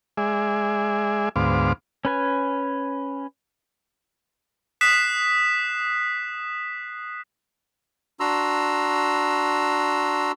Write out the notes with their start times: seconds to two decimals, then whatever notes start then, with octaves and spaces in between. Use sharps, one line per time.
0.17 G#3 G#4 D5 E5
1.36 D2 G#2 B3 C5 F5 D6
2.05 C#4 B4 G#5
4.81 D#6 F#6 B6 C7 E7
8.20 D4 F#4 A#5 C6 E6